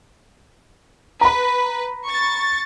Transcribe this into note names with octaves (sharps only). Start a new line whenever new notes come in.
B4 A#5 B5
C#6 A6